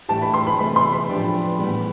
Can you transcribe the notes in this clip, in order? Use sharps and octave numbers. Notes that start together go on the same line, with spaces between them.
A2 E3 A3 D4 G4 A5
B5
C6
B5
C3 E3 A3 B5
C6
B5
A2 F3 A3 D4 G4
A2 E3 G3 B3